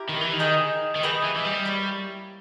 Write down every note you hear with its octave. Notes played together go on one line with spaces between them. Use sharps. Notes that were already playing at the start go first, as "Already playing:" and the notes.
Already playing: E4 G4 A#4
D#3
E3
D#3
D#4 G#4 D#5 G5
D#3
E3 G#4 B4 D#5 G5
E3
E3
G3
A#3 E4 G4 C#5